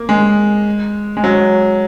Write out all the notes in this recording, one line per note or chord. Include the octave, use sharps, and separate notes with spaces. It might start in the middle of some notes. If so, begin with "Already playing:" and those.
Already playing: A#3
G#3
G#3
F#3